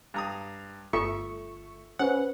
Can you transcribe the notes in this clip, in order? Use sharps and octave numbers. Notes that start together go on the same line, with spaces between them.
G2 A#5 D#6
G1 A3 F4 A4 E5 C#6
C#4 B4 C5 F#5